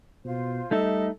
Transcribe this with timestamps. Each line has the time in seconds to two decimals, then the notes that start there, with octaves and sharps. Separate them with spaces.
0.25 B2 F4 C5
0.71 G3 A3 D#4 A4 D#5 E5